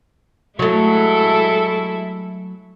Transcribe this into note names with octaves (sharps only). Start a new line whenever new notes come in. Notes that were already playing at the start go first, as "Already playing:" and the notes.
F#3 G#3 A3 E4 A4